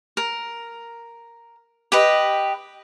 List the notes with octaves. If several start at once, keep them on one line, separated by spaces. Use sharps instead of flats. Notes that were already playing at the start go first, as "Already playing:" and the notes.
A#4
G4 B4 D#5